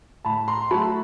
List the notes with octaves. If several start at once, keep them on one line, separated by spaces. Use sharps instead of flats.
A2 A5 B5
A#5 C6
F#3 A3 A5 B5